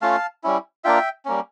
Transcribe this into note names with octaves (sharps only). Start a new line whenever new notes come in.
A3 C#4 F4 F5 A5
G3 C#4 E4
A#3 D4 F4 E5 G5
G3 A#3 C#4